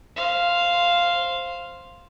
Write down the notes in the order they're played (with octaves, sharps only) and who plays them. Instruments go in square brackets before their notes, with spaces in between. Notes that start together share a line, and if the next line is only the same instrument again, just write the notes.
[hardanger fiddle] C5 F5